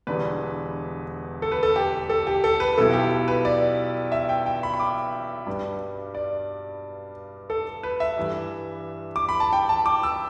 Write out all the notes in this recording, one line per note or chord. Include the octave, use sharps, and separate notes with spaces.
E1 E2 D3 G3 D4 B4
A4
B4
A4
G4
A4
G4
A4
B4
B1 B2 B3 E4 A4
G4
B4
D5
E5
G5
G5
B5
B5
D6
G2 G3 D4
D5
A4
B4
E5
G2 E3 G3
D6
B5
A5
G5
A5
D6
E6